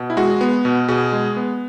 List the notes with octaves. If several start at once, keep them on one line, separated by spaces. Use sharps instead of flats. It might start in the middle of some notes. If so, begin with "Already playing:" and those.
Already playing: B2
E4
G#3 F#4
B3
B2
B2 G#4
G#3
B3